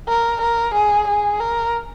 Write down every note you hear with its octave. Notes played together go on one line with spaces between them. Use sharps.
A#4
A#4
G#4
G#4
A#4